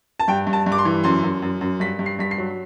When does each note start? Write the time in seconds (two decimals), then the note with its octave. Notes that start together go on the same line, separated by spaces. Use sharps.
0.20 A5
0.28 G2 G5
0.47 G2
0.53 A5
0.66 G2
0.72 D6
0.78 C6
0.85 E3
1.04 F#2 C6
1.23 F#2
1.42 F#2
1.61 F#2
1.80 G2 B6
1.99 G2
2.06 C7
2.19 G2 B6
2.31 C7
2.38 F#3